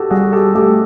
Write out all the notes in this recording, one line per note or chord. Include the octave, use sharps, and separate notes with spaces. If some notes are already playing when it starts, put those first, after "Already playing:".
Already playing: F#4 G4 A4
G3 F#4 G#4
G4 A4
A3 G4 A4